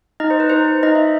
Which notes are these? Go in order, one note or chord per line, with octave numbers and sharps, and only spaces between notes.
D#4 D#5
C5
B4
D#4 C5
D#4 D#5
E5